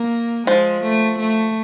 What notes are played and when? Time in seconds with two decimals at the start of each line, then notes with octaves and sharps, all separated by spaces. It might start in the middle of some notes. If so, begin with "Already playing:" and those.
Already playing: A#3
0.47 F3 G#3
0.82 A3
1.18 A3